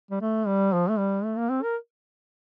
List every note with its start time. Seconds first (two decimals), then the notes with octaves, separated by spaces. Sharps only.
0.11 G3
0.21 A3
0.47 G3
0.73 F3
0.89 A3
0.98 G3
1.25 A3
1.37 A#3
1.50 C4
1.63 A#4